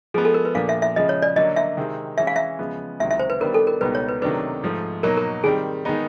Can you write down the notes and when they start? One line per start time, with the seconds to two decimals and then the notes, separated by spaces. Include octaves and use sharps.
0.14 F3 G#4
0.17 G#3 B3
0.25 A4
0.34 A#4
0.45 B4
0.55 A#2 F3 A#3 D4 F5
0.69 E5
0.82 E5
0.96 C#3 F3 G#3 D#5
1.09 C#5
1.22 D5
1.36 D3 F#3 A#3 D#5
1.56 E5
1.77 C3 D#3 G#3 C4
2.18 E3 G#3 C#4 E5
2.27 F5
2.36 E5
2.59 C#3 F3 G#3 B3
3.00 C#2 C3 D#3 F#3 E5
3.10 E5
3.19 C5
3.30 B4
3.40 D#3 G3 B3 D4 A#4
3.54 A4
3.67 A#4
3.81 C#2 B2 G3 B3 D#4 B4
3.95 C#5
4.09 B4
4.22 C3 D#3 F#3 A3 D4 B4
4.63 G#2 F3 A3
5.03 B2 F#3 A#3 D#4 A#4
5.17 A#4
5.44 D#3 G3 C4 G#4
5.85 D#3 G#3 B3 D#4